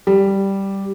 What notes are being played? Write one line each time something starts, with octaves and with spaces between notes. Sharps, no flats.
G3